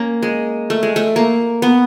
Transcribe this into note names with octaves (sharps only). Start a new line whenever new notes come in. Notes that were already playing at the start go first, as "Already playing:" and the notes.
Already playing: A#3 C#4
G#3
A3
G#3
A3
A#3
B3